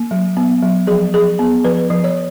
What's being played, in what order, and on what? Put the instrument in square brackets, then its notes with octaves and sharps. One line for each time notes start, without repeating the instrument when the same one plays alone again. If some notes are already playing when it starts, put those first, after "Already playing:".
Already playing: [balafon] A#3
F#3
B3
F#3
F3 G#4
F3 G#4
B3
F3 B4
F3
C#5